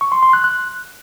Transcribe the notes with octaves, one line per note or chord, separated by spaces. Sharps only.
C#6
C6
C6
F#6
F#6